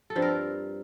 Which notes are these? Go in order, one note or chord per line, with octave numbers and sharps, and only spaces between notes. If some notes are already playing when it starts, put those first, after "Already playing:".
A4
G2 F3 C4
A#4